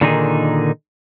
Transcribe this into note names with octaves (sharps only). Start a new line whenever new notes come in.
A#2 D3 D#3 D#4 G#4